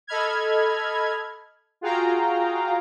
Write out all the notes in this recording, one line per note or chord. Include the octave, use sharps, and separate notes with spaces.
A4 D#5 B5 F6 G#6
F4 F#4 G#4 F5 G5 A#5